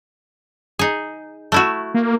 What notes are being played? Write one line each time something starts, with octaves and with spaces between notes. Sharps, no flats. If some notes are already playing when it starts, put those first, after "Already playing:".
D#4 G#4
A3 E4 F#4
A#3